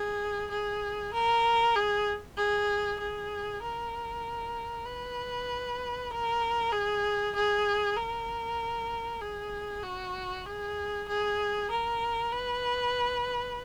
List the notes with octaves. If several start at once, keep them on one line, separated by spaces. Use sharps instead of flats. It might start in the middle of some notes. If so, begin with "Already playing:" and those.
Already playing: G#4
G#4
A#4
G#4
G#4
G#4
A#4
B4
A#4
G#4
G#4
A#4
G#4
F#4
G#4
G#4
A#4
B4